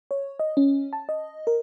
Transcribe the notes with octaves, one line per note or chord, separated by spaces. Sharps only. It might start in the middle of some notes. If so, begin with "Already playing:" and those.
C#5
D#5
C#4
A5
D#5
A#4